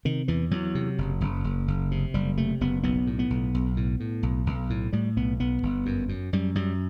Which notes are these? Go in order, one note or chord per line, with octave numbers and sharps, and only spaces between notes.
C3 D#3
E2 E3
E2 F#3
C3
F#1
F#1
F#1
F#1
C3
F#1 G3
C3 A3
F#1 B3
B1 B3
A2
B3
B1
B1
A2
A2
B1
B1
A2
A2 G3
B1 B3
B1 B3
G1
F#2
F#2
F#2 G3
F#2 G3